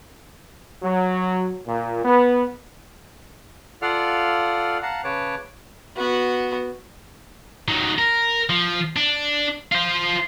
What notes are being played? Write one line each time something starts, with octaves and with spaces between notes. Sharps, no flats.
F#3
A#2
B3
F4 A4 D5 F5 F#5 F6
F5 F#5 A5 A#5
C#3 B4 C#5 A5 D6
B3 F#4
D#3 F#3
A#4
F3
D4
F4 C5